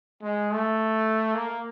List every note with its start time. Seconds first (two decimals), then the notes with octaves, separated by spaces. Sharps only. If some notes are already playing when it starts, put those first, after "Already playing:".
0.22 G#3
0.51 A3
1.35 A#3